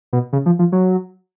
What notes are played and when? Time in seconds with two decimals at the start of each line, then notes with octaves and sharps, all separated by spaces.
0.13 B2
0.33 C#3
0.46 F3
0.59 F3
0.72 F#3